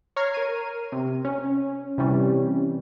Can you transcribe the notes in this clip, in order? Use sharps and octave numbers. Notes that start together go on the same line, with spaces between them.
C#5 A#5 F6 G#6 C7
A#4 D#7
C3
C#4
C3 E3 G3 C#4